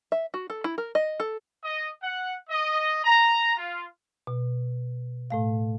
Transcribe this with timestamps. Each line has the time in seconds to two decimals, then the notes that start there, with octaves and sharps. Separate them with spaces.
0.12 E5
0.34 F#4
0.50 A4
0.64 E4
0.78 A#4
0.95 D#5
1.20 A4
1.64 D#5
2.03 F#5
2.49 D#5
3.04 A#5
3.57 F4
4.27 B2
5.30 A2 A3 F5